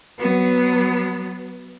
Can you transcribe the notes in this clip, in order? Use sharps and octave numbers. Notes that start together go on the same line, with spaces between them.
F#3 B3